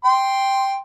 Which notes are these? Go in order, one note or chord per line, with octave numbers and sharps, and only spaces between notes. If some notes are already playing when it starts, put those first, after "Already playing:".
G5 C6